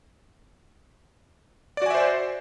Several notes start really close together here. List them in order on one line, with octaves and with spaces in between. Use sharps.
D5 F#4 G#5 E5 C5